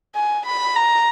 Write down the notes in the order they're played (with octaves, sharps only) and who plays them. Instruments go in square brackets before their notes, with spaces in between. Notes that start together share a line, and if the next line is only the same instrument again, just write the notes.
[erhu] G#5
B5
A#5